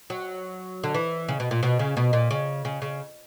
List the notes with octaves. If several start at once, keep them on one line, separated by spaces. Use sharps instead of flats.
F#3
D3
E3
C#3
B2
A#2
B2
C#3
B2
A#2
C#3
C#3
C#3